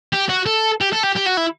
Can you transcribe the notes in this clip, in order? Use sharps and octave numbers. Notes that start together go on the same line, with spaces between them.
G4
F#4
A4
G4
A4
G4
G4
F#4
E4